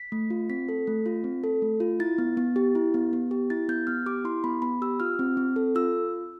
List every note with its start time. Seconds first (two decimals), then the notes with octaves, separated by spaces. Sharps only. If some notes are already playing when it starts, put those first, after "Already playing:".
Already playing: B6
0.12 A3
0.30 F4
0.50 C4 B6
0.69 A4
0.87 A3
1.06 F4
1.24 C4
1.44 A4
1.62 A3
1.80 F4
2.00 E4 A6
2.18 B3
2.37 B3
2.56 G4
2.75 E4
2.94 B3
3.13 B3
3.31 G4
3.50 E4 A6
3.69 B3 G6
3.87 B3 F6
4.06 G4 D6
4.25 E4 C6
4.44 B3 B5
4.62 B3 B5
4.82 G4 E6
5.00 F4 F6
5.19 C4
5.37 C4
5.56 A4
5.75 F4 E6